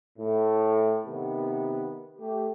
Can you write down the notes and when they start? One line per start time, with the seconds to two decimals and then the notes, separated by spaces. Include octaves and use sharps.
0.18 A2
1.05 C3 D#3 B3
2.17 A3 G4